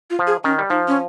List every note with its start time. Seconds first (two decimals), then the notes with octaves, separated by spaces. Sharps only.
0.10 F4
0.19 F3
0.27 G#4
0.44 D#3 C#4
0.58 G3
0.70 F3 D#4
0.88 C#4